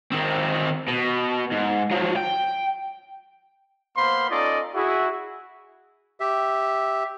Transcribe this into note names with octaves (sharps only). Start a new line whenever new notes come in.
D#3 C4
B2
G#2
F3 F#3
G5
A#3 B3 C5 F5 B5 C6
C#4 D#4 F4 A4 D5 D#5
E4 F#4 G#4
G4 E5